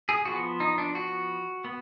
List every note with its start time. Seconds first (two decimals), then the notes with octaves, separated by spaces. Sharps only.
0.09 G#4
0.25 F3 B3 F#4
0.60 D#4
0.78 D4
0.95 F#4
1.65 B3